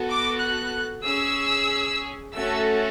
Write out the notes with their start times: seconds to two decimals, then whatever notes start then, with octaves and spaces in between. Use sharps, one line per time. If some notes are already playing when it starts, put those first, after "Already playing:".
Already playing: B3 F#4 A4
0.09 D6
0.41 F#6
1.05 C#4 G#4 E6
2.34 A3 C#4 F#4 A4 E6